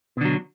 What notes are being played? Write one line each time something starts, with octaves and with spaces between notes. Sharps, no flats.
B2 D3 F#3